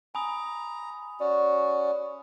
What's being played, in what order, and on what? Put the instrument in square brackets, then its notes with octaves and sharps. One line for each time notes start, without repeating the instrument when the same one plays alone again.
[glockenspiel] G#5 B5 D#6 [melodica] A#5
[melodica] C#4 F#4 [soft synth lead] D5